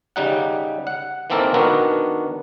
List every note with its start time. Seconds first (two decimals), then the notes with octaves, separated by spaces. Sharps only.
0.16 C#3 G3 D#4 F#5
0.87 F#5
1.30 D#3 E3 A#3 C4 A4 A#4
1.54 D#3 B3 D4 F#4 A#4